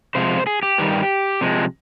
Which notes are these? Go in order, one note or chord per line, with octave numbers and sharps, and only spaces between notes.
C3 F3 G#3 C5
G#4
G4
G2 D#3 G3
C3 F3 G#3